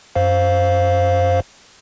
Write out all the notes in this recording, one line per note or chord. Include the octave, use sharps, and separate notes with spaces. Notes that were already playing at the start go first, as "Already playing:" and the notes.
F#2 C5 F5